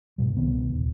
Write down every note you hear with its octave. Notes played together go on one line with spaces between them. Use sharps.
D2 G#2 B2 G3
C2 B2 D#3 B3
D#1